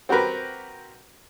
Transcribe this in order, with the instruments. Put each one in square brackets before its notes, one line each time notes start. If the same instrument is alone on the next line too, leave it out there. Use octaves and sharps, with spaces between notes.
[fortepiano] C4 F#4 G4 A#4 B4